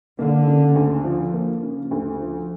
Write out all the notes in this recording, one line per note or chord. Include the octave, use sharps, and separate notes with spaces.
D3 A#3
C#3
D2
F3
A#3
C#3
D2
F3